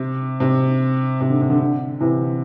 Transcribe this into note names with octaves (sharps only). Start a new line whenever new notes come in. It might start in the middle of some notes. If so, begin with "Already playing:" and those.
Already playing: C3
C3
C3
D3
C3
D3
D3
C3 E3